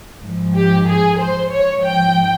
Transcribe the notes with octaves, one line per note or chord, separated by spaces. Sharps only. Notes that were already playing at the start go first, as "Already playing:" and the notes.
G#2 F3
G4
G#4
C5
G#2 F3 C#5
G5